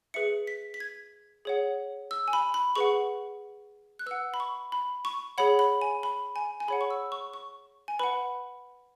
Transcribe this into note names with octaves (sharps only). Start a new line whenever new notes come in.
G#4 B4 E5 C#7
B6
B6
G#6
G#4 C#5 F#5
E6
G#5
B5
B5
G#4 B4 F#5 C#6
F#6
B4 F#5 E6
B5
C#6
B5
C#6
G#4 C#5 F#5 B5
B5
G#5
B5
G#5
G#5
G#4 C#5 F#5 B5
C#6
E6
C#6
C#6
G#5
B4 F#5 B5